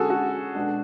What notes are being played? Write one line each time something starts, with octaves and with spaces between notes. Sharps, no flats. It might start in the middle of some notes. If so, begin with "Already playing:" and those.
Already playing: D3 G#3 C#4 F#4 G#4 A4
F#4
B2 G#3 D4